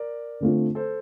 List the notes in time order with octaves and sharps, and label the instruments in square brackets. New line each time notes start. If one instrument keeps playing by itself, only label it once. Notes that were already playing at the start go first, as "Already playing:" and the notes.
Already playing: [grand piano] A#4 D5
[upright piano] D3 A3 C4 F4
[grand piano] A4 C5